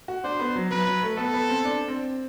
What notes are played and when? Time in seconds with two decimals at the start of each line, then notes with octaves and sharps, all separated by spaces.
0.08 F#4
0.24 D4 C5
0.40 B3
0.56 F#3
0.71 F#3 B4
0.87 F#3
1.02 A3
1.17 B3 A4
1.34 B3
1.49 C4
1.65 D4
1.88 C4